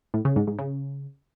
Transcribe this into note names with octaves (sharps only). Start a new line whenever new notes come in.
A2
C#3
G#2
G#2
C#3